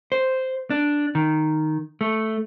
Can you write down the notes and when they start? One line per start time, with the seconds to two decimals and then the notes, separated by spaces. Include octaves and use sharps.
0.12 C5
0.70 D4
1.15 D#3
2.01 A3